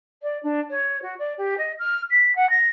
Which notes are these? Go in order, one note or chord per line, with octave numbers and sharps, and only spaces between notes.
D5
D4
C#5
F#4
D5
G4
D#5
F6
B6
F#5
A#6